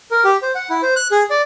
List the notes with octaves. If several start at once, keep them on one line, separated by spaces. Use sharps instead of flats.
A#4
G4
C5
F#5
E4
C5
F#6
G#4
D5